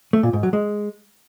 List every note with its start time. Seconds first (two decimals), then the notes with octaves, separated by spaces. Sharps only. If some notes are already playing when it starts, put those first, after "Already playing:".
0.13 A3
0.23 A#2
0.33 G#2
0.43 F#3
0.53 G#3